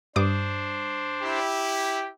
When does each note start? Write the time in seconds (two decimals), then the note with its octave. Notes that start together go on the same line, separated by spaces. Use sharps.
0.16 G2 D4 C5 D6 D#6
1.22 E4 G4